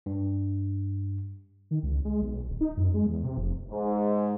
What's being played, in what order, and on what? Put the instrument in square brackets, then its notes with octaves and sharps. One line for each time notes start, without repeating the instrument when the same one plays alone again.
[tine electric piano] G2
[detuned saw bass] D#3
C#2
G#3
B1
D1
D#4
F#2
G#3
E2
C3
F1
[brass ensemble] G#2